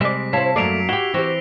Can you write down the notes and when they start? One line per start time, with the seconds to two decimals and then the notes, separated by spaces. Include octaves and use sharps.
0.01 C3 G3 G#3 C4 D5 E5 B6
0.33 E4 C5 C#5 F5 A5 B6 C7
0.56 F#2 F#3 A3 A#3 D5 C7 D7 F7
0.89 E4 F#4 G4 G7
1.14 E3 C4 F#4 G4 A#6